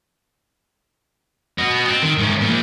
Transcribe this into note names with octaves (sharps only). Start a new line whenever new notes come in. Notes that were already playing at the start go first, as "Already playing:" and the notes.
F#4 D#5
C4
D#3
G#2 C#4
A#2 F3